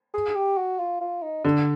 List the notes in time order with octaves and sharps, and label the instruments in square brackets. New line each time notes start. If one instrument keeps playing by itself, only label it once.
[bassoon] G#4
G4
F#4
F4
F4
D#4
[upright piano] D3 [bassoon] D4